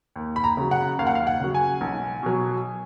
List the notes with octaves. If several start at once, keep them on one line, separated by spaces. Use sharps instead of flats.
D#2
B5
A#5
C#3 F#3
F#5
D#2 F5
F#5
F5
F#5
C#3 F#3
G#5
B1
B2 F#3